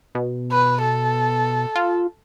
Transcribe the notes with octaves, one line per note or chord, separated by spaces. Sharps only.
B2
B4
A4
F4